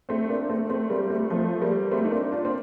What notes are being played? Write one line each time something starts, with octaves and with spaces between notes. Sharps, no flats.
A3 C4
A#3 D4
A3 C4
A3 C4
G3 A#3
A3 C4
F3 A3
G3 A#3
A3 C4
D#4
A#3 D4
D4 F4
C4